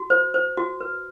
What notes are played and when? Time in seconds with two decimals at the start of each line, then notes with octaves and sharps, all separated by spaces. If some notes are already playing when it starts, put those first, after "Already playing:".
Already playing: F#4
0.10 C5
0.34 C5
0.57 F#4
0.81 B4